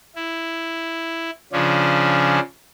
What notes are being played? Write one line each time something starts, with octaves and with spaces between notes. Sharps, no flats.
E4
C#3 F3 C#4 D4